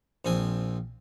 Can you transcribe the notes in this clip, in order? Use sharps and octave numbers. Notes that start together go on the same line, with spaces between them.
A#1 F3 C4 G#5 D#6